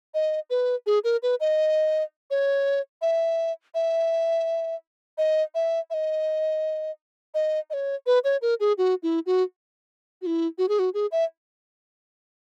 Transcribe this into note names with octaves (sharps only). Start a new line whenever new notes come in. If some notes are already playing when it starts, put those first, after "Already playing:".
D#5
B4
G#4
A#4
B4
D#5
C#5
E5
E5
D#5
E5
E5
D#5
D#5
D#5
C#5
B4
C#5
A#4
G#4
F#4
E4
F#4
F#4
E4
F#4
G#4
F#4
G#4
E5